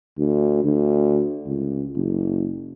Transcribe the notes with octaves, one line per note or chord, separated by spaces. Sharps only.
D2
D2
C#2
F#1